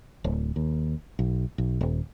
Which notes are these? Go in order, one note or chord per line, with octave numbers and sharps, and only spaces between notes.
D1
D#2
B1
B1
D#1